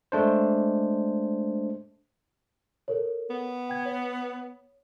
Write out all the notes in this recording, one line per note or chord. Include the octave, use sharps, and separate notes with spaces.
G#3 A3 D4 C5
A4 A#4 C#5
B3
G5 G#6
C#5